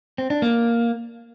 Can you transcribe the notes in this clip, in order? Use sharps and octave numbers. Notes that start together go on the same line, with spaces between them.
C4
D4
A#3